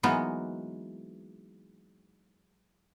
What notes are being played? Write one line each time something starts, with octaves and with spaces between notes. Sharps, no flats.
E3 F#3 G#3 A#3 B3 D#4